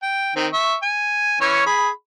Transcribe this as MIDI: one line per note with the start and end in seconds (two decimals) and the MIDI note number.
0.03 0.34 79
0.36 0.47 51
0.36 0.47 60
0.53 0.76 76
0.53 0.76 85
0.83 1.37 80
1.41 1.63 52
1.41 1.63 61
1.41 1.63 73
1.66 1.90 68
1.66 1.90 83